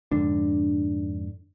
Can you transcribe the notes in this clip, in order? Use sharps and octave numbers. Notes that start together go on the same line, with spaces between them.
F2 G#2 D3 D4